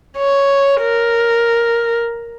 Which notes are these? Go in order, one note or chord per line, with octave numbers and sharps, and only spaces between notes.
C#5
A#4